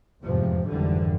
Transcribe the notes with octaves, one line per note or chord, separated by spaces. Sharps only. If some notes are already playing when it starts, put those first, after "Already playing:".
F1 E2 G#2 C3 F3
G#1 F2 D3 E3 G3